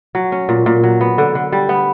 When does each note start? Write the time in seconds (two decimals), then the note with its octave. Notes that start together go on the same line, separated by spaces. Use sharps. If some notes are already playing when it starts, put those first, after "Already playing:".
0.15 F#3
0.32 C#4
0.49 A#2
0.66 A#2
0.83 F#3
1.01 B3
1.18 D3
1.35 D3
1.52 G3
1.69 B3